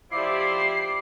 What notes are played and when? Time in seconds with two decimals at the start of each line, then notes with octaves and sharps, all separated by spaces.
0.11 F3 E4 G4 D5 D6 C7